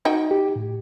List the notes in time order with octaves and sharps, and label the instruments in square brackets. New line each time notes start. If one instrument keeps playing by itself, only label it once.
[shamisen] D#4 F#4 G5
[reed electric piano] G4
A2